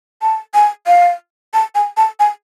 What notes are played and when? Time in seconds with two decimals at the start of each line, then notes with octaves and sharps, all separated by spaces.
0.22 A5
0.54 G#5
0.87 F5
1.54 A5
1.75 G#5
1.97 A5
2.20 G#5